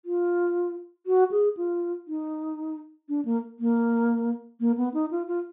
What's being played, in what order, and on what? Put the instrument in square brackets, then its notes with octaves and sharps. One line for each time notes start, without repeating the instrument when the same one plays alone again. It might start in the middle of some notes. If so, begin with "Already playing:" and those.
[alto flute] F4
F#4
G#4
F4
D#4
D4
A#3
A#3
A#3
B3
D#4
F4
F4